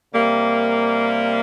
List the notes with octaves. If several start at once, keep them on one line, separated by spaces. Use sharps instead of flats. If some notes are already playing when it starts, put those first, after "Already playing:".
C3 G3 A#3